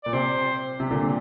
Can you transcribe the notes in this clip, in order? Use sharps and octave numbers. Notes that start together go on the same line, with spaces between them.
A#2 D5
C3 C5
C3
A#2 D3